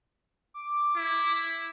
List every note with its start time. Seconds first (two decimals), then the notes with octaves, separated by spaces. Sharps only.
0.54 D6
0.97 E4